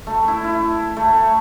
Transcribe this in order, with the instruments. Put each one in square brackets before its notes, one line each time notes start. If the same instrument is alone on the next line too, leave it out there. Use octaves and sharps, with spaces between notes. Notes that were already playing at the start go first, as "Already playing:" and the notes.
[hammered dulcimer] A3
E4
E4
A3